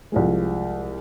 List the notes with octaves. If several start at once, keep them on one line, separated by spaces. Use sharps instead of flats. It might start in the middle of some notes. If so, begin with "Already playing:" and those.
C2 F3 G#3